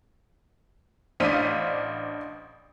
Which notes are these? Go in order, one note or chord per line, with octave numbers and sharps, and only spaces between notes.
A1 D4 C5 F5 B6 D#7